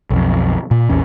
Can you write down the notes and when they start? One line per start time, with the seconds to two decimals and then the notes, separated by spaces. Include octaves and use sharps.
0.10 B1 F2
0.71 A#2
0.89 A#1 E2 C#4